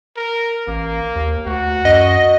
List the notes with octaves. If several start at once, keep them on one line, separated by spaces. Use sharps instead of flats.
A#4
A1 A#3
D#2
D2 F#4
F#2 D#5